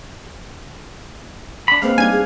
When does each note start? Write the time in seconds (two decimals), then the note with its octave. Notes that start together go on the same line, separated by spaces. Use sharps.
1.68 D4 B5
1.82 G#3 A#3 C4 B4 F5
1.98 G3 D4 D#4 G#5 G#6
2.11 G#4